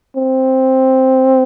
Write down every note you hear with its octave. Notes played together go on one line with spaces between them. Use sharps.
C4